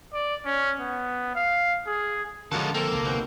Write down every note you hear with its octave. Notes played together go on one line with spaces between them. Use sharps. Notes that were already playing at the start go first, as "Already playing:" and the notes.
D5
C#4
B3
F5
G#4
F#2 D3 F3 G#3 F4 A4
A#3 C4 A4
C2 D3
D#2 B2 C4